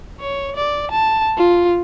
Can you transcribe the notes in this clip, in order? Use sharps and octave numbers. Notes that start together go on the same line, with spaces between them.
C#5
D5
A5
F4